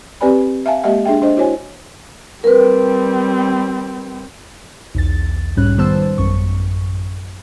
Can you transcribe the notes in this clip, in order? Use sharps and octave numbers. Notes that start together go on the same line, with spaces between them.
C4 G4 B4 D5 G#5 B5
E5 F5 G#5 A5
G#3 A#3 G4 D#5 E5 F#5
D4 G#4 E5 G5
D4 C5 D#5
E4 F#4 C5 C#5 G#5
G3 C4 A#4 B4
B1 E2 A6
B1 G#2 G3 C#4 F#6
D#3 G3 B3 C5 A5 E6
A1 F#2 C#6